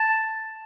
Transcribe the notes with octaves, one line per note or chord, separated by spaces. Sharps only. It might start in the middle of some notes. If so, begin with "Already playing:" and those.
Already playing: A5